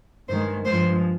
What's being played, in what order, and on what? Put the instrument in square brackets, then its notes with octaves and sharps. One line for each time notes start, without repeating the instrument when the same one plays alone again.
[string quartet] G2 D#3 G#3 C5
G2 F3 G#3 C5